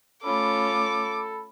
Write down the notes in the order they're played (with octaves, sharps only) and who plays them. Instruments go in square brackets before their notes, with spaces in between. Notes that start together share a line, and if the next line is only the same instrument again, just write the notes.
[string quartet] A3 C#4 F4 [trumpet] A4 [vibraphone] B5 [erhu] D6